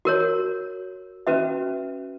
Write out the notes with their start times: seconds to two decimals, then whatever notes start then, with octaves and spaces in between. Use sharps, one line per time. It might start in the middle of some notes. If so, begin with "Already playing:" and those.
0.05 F#4 A#4 C#5
1.27 C#4 F#4 B4 E5